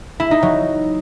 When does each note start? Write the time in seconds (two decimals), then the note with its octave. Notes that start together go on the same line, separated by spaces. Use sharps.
0.20 E4
0.31 D#4
0.43 F#3